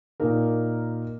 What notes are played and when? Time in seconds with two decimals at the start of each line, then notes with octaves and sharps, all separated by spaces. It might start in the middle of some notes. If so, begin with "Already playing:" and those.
0.20 A#2 A#3 D#4 A#4